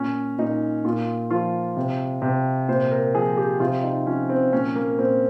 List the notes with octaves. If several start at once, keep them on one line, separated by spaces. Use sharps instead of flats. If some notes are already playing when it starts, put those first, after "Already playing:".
Already playing: A#2 C#4
A#2 D#4
A#2 F4
F3 F4
C3
C3
A#2 C5
A#4
F3 G#4
G4
C3 F4
D#4
F3 C#4
C4
A#2 C#4
A#3
A#2 C4